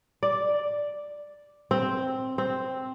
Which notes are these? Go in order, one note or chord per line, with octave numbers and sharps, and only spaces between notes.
D5
C4
C4